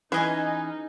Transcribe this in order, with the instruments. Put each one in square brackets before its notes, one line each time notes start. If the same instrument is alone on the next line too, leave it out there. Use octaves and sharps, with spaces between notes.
[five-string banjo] E3 [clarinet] C#4 [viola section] D#4 [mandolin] G#4 D#5